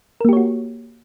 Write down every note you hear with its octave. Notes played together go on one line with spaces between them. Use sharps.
A#3 F#4 G4 A#4 C#5